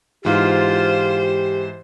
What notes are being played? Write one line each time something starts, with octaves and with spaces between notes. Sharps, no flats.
G#2 E3 F4 G4 C5